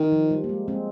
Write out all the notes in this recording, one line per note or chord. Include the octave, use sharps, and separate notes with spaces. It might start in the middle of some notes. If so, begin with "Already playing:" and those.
Already playing: D#3
F3
G3
A#3
G#3
G#3 C4